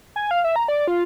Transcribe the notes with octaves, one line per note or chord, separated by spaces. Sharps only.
G#5
F5
E5
A#5
D5
F4